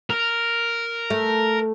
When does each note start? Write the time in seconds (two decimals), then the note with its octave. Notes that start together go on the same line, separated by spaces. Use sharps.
0.10 A#4
1.10 A3